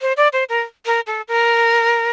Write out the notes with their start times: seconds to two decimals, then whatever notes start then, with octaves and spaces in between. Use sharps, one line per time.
0.02 C5
0.17 D5
0.33 C5
0.49 A#4
0.86 A#4
1.07 A4
1.28 A#4